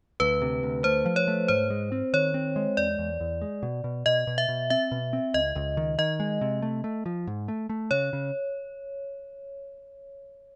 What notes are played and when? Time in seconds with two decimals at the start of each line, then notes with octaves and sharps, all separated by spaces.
0.20 D2 B4
0.42 C3
0.63 D2
0.84 A3 C5
1.06 F3
1.16 C#5
1.28 A3
1.48 G#2 C5
1.70 G#3
1.92 C4
2.13 D#3 C#5
2.34 C4
2.56 G#3
2.77 E2 D5
2.98 E2
3.20 E2
3.42 G#3
3.63 B2
3.84 B2
4.06 B2 D#5
4.27 B2
4.38 E5
4.49 B2
4.70 C4 E5
4.91 B2
5.13 C4
5.34 C#2 D#5
5.55 C#2
5.77 D#3
5.98 D#3 D#5
6.20 G#3
6.41 C3
6.62 A3
6.84 A3
7.06 F3
7.27 G#2
7.48 A3
7.69 A3
7.91 C#3 C#5
8.13 C#3